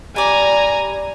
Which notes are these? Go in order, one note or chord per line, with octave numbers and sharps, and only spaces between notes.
G3 D5 G#5 A#5